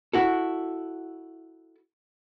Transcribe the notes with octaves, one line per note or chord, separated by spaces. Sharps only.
E4 F#4 A4